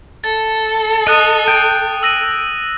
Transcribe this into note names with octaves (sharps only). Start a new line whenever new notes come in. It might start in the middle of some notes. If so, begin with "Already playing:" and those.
A4 A6
D#5 D#6 F#6 D#7
G5
E6 A#6 D#7